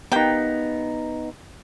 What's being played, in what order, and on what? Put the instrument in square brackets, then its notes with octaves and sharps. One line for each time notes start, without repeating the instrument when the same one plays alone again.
[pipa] A#3 G4 G5 [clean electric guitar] B3 D#4